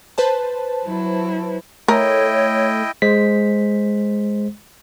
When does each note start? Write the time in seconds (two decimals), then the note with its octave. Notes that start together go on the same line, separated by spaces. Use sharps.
0.18 B4 C5 A5
0.85 F#3 E4
1.88 A3 E4 A#4 C#5 D#5 G5
3.02 G#3 C5 B6